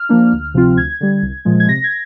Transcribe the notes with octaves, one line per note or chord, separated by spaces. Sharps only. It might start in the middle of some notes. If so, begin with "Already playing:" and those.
Already playing: F6
F3 A#3 D4
D2
C3 F3 C4 F4
D2 G#6
D3 G3
C2
A#2 F3 G#3
G#6
C3 A#6
G#6